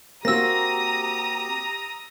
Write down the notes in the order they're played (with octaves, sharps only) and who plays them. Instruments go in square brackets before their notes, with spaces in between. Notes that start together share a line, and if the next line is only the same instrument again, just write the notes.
[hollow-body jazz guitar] A#3 C4 F#4 [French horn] G4 [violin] A#5 D#6 [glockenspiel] E6 A#6